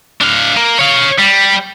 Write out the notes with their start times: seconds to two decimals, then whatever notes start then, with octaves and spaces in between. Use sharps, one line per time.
0.21 D4 F5
0.57 A#3
0.79 C#5 F5
1.18 G3